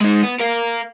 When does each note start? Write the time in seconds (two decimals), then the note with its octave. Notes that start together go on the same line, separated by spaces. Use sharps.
0.01 G#3 D#4
0.23 B3
0.40 A#4 F5